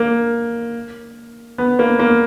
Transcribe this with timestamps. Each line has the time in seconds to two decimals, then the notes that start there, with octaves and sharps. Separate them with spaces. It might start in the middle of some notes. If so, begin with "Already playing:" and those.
Already playing: A#3
1.58 B3
1.79 A#3
1.99 A#3